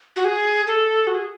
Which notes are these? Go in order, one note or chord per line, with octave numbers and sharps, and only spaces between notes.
F#4
G#4
A4
F#4
G#4